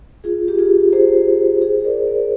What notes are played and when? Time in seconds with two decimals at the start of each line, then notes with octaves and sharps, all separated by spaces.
0.24 F4 G#4
0.48 G4
0.58 F4 G#4
0.93 G#4 C5
1.61 G#4 C5
1.84 A#4 D5
2.07 A#4 D5